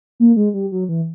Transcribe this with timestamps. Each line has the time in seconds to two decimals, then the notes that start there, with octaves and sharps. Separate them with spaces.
0.20 A#3
0.36 G#3
0.54 G3
0.72 F#3
0.89 E3